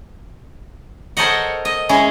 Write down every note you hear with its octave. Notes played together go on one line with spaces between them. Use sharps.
A4 A#4 C5 C#5 D#5 F#5
D#5
G#3 C#4 E4